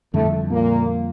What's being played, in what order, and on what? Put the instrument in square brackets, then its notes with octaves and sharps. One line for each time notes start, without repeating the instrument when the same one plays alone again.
[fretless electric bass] F2 D3 G3 [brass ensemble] A2 A3
[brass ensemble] A#2 A#3